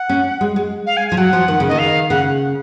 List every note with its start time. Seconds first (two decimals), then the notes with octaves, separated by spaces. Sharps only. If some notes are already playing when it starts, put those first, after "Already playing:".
Already playing: F#5
0.09 C#4
0.41 G#3
0.56 G#3
0.86 F5
0.97 G#5
1.08 G#5
1.12 F3
1.17 F#3 F#5
1.33 F3
1.48 D#3
1.60 C#3
1.68 D#3 D#5
1.78 F5
2.09 C#3 F#5